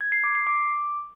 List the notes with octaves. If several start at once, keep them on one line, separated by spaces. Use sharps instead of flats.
G#6
C7
D6
C7
D6